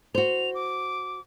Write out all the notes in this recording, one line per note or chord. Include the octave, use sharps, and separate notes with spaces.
F#4 C5 F7
D6